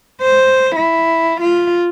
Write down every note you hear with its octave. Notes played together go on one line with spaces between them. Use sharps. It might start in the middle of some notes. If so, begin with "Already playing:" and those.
C5
E4
F4